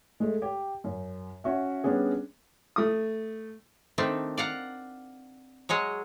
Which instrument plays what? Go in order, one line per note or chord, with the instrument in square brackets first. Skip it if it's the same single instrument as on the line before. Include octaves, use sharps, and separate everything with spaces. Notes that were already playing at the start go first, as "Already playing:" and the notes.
[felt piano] G#3 A3
G4
F#2
C#4 F#4 E5
G3 B3 C#4 D4 G#4
[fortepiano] A3 D#6
[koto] D#3 A3 C4 D4
D5 F5 F#5 A#5
F#3 G#3 C#5 D#5